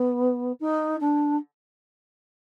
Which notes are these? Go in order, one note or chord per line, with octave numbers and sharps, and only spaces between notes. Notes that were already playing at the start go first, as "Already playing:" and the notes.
Already playing: B3
D#4
D4